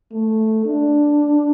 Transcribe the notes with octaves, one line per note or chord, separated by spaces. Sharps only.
A3
D4